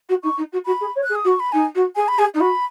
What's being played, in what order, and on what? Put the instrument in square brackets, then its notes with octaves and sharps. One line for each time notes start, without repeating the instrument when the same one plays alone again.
[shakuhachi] F#4
[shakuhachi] D#4 [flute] C#6
[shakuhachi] D#4
F#4
[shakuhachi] F#4 [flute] B5
[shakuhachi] G#4
C#5
[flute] F#6
[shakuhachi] G#4
[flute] D#6
[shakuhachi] F#4
[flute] C#6
B5
[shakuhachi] D#4 [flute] G#5
[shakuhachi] F#4
[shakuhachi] G#4 [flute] G#5
[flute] B5
[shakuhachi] G#4 [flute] G#5
[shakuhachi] D#4
[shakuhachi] F#4 [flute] B5